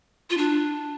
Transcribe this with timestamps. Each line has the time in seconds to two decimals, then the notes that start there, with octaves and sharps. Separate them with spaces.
0.30 F4
0.37 D4